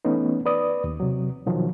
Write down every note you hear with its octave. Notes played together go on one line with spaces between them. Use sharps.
E3 A3 B3 C#4 D#4
B4 D5 D#6
D#2
C3 F#3
B2 D#3 F3 F#3